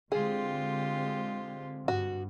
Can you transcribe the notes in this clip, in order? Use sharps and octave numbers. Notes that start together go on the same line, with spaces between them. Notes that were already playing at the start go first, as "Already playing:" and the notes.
D3 G#3 C4 F4 G4 G#4
G2 F#4